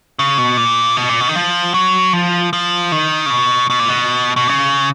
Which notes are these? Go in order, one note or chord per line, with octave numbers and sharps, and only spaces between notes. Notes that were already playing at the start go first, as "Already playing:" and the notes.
C#3
B2
A#2
B2
A#2
B2
D#3
F3
F#3
F3
F3
D#3
C#3
B2
B2
A#2
B2
B2
C#3